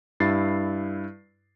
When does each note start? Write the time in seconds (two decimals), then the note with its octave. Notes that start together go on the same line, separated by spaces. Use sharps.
0.20 G2 E4 A6 C7